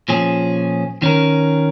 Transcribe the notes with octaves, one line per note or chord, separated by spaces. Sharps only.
A#2 F3 C#4 G#4
D#3 C#4 A#4